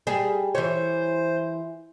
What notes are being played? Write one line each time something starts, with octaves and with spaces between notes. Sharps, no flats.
G3 G#4
E3 C5 C#5